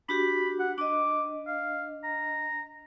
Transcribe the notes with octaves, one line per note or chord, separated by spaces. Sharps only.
D4 F#4 G4 B5
F#5
D4 D#5 D6
F5
A#5